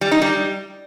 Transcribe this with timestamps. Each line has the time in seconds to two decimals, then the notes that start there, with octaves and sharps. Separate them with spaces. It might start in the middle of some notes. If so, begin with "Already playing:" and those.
0.01 G3
0.11 D#4
0.22 G3